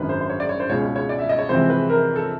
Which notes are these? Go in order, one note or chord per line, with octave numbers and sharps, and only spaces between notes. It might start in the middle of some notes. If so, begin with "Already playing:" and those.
Already playing: G#1 F#2 D3 F#3 B4
C5
C5
C#5
D5
C#5
C5
C#2 B2 G#3 C#4 C#5
C#5
C#5
D5
E5
D#5
C#5
F2 C3 E3 G#3 C4 C5
B4
A#4
A4